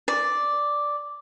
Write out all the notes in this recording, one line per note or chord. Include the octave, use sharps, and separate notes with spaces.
D5